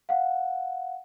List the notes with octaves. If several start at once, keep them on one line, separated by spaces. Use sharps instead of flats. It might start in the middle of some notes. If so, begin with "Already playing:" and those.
F5 F#5